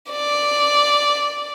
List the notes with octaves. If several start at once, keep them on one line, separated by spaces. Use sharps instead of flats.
D5